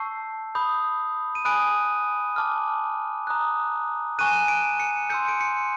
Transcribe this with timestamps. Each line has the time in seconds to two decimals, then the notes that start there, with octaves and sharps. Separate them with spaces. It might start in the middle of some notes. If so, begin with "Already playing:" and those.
Already playing: A5 C#6 E6 G6 C7
0.55 B5 D#6 G6
1.35 D#7
1.45 G#5 B5 D#6 F#6 D7
2.36 A5 D6 F6
3.27 A#5 D#6 F#6
4.19 G#5 C#6 F#6 D#7
4.26 E7
4.33 D#7
4.48 D7
4.80 C#7
5.10 C6 E6 G6 C#7
5.28 D7
5.41 C#7